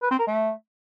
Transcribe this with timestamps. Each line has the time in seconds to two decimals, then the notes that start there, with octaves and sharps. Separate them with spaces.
0.03 B4
0.11 C4
0.19 A#4
0.27 A3